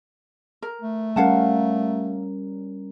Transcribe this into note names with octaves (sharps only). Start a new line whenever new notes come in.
A#4
A3
G3 C#4 A#4 F5 F#5 A5